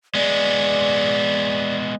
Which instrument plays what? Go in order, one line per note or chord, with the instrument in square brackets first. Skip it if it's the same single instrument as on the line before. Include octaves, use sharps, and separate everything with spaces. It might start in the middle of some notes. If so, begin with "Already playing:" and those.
[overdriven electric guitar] G#3 B3 [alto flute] D5